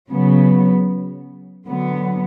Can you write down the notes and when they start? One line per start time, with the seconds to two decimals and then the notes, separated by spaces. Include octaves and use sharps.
0.11 C#3 F#3 B3
1.67 D3 F#3 B3